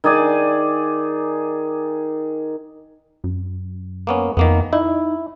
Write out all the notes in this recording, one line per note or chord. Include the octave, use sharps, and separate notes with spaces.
D#3 G#4 D5 G#5
F#2
A#3 B3 C#4
F2 D#3 A#3 B3
D#4 E4